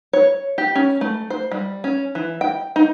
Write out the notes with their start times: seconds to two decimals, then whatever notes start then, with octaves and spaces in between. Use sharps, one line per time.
0.13 C#5
0.58 G4
0.75 C#4
1.01 A3
1.30 C5
1.51 G3
1.84 C#4
2.15 E3
2.41 G5
2.76 D#4